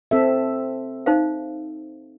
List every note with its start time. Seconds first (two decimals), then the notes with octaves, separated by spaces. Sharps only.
0.11 C4 A4 E5
1.06 D#4 C5 F5